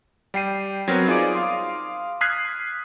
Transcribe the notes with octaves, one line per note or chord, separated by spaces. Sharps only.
G3 G5 C7 D#7
F#3 B3 C4 A#4 B4
D#4 F4 G#4 C5 D5 D6
F5 C6 D#6
D#6 F6 F#6 G#6 B6 C7